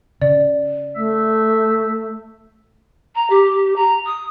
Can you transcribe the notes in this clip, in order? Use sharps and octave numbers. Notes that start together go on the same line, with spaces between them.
C#3 D5
A3 E5
A#5
G4
A#5
D#6